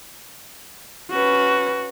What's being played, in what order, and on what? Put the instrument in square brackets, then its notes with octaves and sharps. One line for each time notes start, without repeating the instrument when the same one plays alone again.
[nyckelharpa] C#4 B4 [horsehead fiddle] F#4